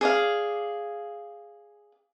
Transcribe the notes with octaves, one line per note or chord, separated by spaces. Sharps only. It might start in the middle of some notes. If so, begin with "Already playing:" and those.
G#4 D5 F5